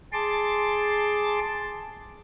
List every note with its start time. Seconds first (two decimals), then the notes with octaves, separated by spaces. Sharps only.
0.13 G#4 A5 C6 D6